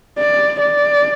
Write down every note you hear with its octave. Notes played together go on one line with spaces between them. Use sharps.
D5
D5